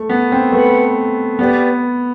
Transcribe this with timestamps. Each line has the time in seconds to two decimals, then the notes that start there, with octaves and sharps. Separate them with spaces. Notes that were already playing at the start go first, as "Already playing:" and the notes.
Already playing: A3
0.09 B3
0.32 C4
0.52 A3 B4 F#5 B5
1.39 B3 G4 B4 D5